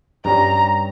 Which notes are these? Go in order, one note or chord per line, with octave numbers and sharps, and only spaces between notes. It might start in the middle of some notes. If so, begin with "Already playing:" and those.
G2 G3 C#4 A#5